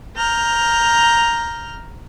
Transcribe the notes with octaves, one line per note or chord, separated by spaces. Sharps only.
A#5 F6 G6